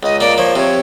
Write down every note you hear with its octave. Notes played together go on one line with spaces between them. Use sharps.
C#2 D#5
A#3 D5
F3 C#5
C3 C#5